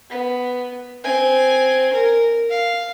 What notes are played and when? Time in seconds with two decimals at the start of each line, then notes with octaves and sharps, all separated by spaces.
0.10 B3
1.04 C4 G#5
1.94 A#4
2.50 F5